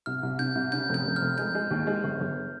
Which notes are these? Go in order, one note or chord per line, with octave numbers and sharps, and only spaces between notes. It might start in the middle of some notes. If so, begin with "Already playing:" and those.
C2 F6
C2
C3 G6
C2
C#3 G6
F1
G6
F1
F6
F1
G#3 G6
G#3
D#2
G#3
G1
G1